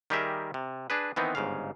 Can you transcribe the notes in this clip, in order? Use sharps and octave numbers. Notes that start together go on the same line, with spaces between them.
D#3 G3 G4 G#4 A#4 E5
C3
D4 G#4 B4
D#3 E3 B3 C4 D#4
G1 G#2 C#3 F5